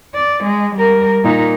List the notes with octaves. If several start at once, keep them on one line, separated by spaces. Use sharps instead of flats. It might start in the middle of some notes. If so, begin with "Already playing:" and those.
D5
G#3
G3 A#4
A#2 D#4